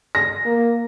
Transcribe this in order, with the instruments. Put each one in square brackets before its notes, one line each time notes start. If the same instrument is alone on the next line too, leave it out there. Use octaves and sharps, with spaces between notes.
[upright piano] A#6
[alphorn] A#3